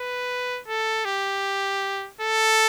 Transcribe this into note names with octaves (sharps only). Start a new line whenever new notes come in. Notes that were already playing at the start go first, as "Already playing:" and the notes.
Already playing: B4
A4
G4
A4